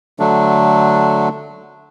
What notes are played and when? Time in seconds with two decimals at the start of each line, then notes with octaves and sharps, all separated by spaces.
0.20 D3 F#3 A3 D4